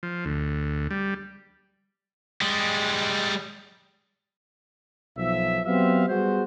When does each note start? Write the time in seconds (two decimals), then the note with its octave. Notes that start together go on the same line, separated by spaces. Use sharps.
0.03 F3
0.25 D2
0.91 G3
2.41 G3 G#3
5.17 B1 F3 E5
5.65 F#3 B3 C4 G4 E5 F5
6.07 G3 B3 F#4 G#4 C5